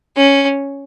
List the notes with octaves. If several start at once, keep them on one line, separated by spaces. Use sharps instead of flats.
C#4